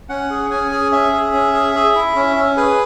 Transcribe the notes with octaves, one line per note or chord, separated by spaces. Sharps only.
C#4 F#5
G#4
C#4 G#5
G#4
C#4 E5
G#4
C#4
G#4
G#4
E4
C#4
C#4
G#4 B4